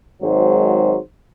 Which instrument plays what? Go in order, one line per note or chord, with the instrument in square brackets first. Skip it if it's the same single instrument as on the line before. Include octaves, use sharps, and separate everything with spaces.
[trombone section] G#1 G#2 F#3 C5